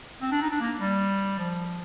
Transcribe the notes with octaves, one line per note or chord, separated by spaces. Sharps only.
C4
D4
D#4
D4
A#3
G3
F3